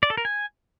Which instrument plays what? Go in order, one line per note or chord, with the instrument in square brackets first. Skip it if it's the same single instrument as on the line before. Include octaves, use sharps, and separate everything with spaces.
[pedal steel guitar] D5
A4
A#4
G#5